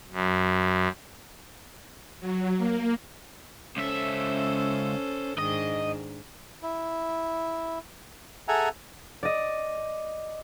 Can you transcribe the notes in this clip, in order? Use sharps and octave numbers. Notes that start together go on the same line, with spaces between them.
F#2
F#3
A#3
C#2 C#4 A4 C5 E5
G#2 D#3 D4 D#5
E4
G#4 A4 E5 F#5 G#5 A#5
D5 D#5